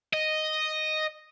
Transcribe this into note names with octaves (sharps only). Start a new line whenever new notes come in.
D#5